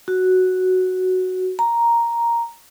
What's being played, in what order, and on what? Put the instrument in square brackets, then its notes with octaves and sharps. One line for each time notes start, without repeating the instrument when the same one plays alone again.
[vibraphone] F#4
A#5